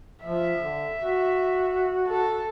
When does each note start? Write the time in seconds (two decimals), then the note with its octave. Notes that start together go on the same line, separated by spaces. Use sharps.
0.24 F3 E5
0.60 D3
1.02 F#4
2.08 A4